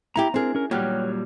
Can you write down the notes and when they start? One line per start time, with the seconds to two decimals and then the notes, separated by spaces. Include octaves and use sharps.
0.16 B3 E4 G4 A#5
0.34 C4 D4 G#4 A#4
0.55 C#4 A#4
0.71 A#2 F#3 G3 B3 G4 C#5 F6 F#6